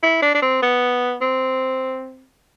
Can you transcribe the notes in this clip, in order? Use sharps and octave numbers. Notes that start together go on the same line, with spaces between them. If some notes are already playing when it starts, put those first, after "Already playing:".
E4
D4
D4
C4
B3
C4